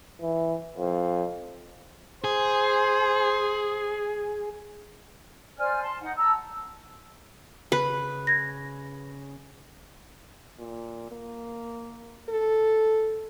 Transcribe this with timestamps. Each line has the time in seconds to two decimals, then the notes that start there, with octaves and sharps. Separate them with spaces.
0.21 E3
0.77 F2
2.24 G#4 C5
5.58 C5 D5 G#5 F6
5.82 A5 C6
6.00 D#4 F#5
6.17 A5 A#5 E6
7.72 C#3 B4
8.27 G#6 A#6
10.59 A#2
11.11 A#3
12.29 A4